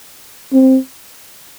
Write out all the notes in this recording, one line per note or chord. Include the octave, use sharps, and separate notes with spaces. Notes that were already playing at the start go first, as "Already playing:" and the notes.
C4